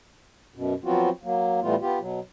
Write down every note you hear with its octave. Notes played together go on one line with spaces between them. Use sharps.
F#2 B2
F3 F#3 B3 C4 F4 F#4
F#3 A#3
A2 E3 G3 A3 B3 F4
B3 F4 G4
B2 F#3